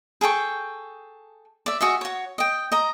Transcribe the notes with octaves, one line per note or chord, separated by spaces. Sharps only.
G#4 A4 G5 C#6
D5 E5
F#4 G#4 D#5 E5
F#4 C#5
D#5 G5
D#5 A#5